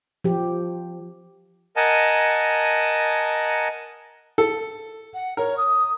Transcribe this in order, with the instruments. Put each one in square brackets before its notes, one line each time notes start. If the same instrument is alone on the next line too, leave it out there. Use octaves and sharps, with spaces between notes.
[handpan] F3 G4
[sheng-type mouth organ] A#4 D#5 F#5 G#5 A5
[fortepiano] A4
[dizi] F#5
[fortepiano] A#4 [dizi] C#5
[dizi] D#6